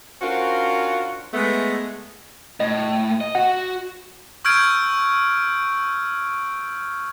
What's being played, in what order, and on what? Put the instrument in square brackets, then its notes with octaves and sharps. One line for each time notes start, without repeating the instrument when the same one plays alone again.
[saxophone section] C#4 D4 F4 F#4 A#4 C5
G#3 A3 B3
[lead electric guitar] A2 [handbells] D#5
[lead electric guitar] D#5
[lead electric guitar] F#4 [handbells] F#5
[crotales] C#6 E6 F6 G6 G#6 D7